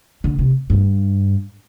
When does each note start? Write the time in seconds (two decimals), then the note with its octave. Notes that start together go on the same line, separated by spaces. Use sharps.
0.24 D3
0.39 C3
0.70 G2